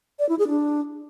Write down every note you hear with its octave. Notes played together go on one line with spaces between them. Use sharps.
D5
E4
G#4
D4